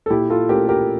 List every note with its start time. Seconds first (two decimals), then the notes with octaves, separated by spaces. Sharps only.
0.06 A4
0.10 A#2 E4 G4
0.30 F4 A4
0.49 A3 C#4 G4 A#4
0.69 G4 A#4